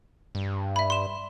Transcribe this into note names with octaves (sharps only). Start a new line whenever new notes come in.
G2
E5 B5
C6 E7